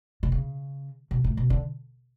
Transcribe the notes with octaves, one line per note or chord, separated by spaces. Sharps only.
B2
C#3
B2
A2
B2
D3